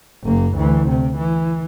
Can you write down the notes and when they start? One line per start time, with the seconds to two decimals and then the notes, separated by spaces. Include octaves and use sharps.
0.23 F#1 A#3
0.56 D2 E3
0.89 C3
1.18 E3